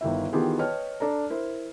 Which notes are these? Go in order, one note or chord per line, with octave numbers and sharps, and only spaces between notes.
G1 D#3 E4 E5
D#3 E3 B3 F4 G4 G#4
B4 C#5 D#5 G5 A5 F6
D4 A4 A#5
E4 A#4 C5